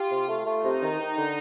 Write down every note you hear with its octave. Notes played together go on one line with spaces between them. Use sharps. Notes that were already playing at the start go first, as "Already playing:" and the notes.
Already playing: F4 G4
C3
A3
A3
C3 D#4
D#3
D#3
D3